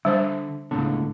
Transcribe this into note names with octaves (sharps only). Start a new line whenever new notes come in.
D3 G3 C5
C#2 A2 D3 B3